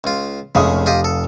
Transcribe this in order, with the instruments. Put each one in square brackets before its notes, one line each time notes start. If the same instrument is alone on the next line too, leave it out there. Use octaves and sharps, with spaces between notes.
[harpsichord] C#2 F4
[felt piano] F1 F5 D#6 [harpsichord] C#3 G#3 A3
[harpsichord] F4 G4 D#5
A4